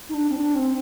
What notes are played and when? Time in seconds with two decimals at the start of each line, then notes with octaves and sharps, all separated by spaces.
0.09 D#4
0.14 D4
0.29 C4
0.34 D4
0.55 C4